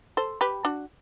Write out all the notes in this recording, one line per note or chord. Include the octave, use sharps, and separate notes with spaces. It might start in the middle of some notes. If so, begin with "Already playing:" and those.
A4 C5
G4 B4
D4 F#4